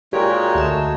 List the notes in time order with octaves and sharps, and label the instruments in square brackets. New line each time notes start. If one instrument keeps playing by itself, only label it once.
[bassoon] A#2 [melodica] G#3 C#5 [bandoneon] D#4 F#4 [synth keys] G4 A#4
[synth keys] D2 E7 [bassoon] A3